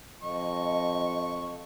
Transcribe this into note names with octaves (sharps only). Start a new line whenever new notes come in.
F2 D#5 C#6